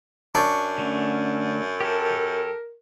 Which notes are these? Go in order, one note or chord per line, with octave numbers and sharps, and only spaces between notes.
F#2 D4 C#6
D3 A3 C#4
G4 A4 A#4